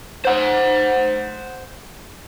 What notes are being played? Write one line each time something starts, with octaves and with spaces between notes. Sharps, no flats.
C5 F#5